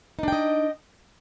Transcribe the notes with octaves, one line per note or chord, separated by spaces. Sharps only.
D4 D#4 D#5 G5